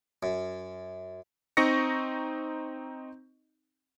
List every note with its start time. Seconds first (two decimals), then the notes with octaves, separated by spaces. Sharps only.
0.23 F#2
1.57 C4 D#4 D#5 C#6 A#6 C#7